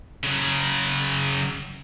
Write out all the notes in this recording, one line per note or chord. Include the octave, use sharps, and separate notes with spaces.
C#3 F#3